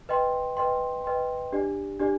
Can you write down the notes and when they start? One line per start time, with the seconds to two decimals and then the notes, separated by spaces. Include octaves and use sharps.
0.09 B4 D#5 G5 C6
0.57 B4 D#5 G5 C6
1.04 B4 D#5 G5 C6
1.52 D4 G4 D5
1.99 D4 G4 D5